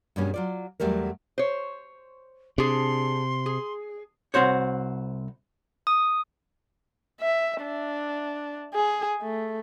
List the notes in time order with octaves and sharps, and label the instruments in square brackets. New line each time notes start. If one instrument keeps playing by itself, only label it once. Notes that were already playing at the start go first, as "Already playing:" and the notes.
[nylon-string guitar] G2 B2 G3 A#3 C#4 G#4
F#3 F4 D5
E2 F#3 G3 A3 A#4
[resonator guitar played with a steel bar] C5 C#5
[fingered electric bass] C3 [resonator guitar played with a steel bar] D4 G#4 [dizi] C6
[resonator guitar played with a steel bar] G#4
[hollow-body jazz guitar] C2 C4 F#4 C5 C#5
[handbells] D#6
[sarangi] E5
D4
G#4
A3